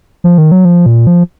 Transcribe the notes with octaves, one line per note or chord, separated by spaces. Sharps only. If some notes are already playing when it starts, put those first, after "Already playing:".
F3
D#3
F#3
F3
A#2
F3